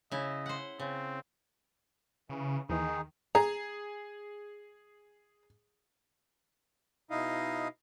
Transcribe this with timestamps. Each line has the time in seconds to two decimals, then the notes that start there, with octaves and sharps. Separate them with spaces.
0.12 C#3 E4 D#5
0.46 C5 F#5
0.79 C#3 C4
2.29 C#3 E3
2.69 D#2 D#3 E3 D#4 G#4
3.35 G#4 A#5
7.11 B2 D#4 E4 D#5 F5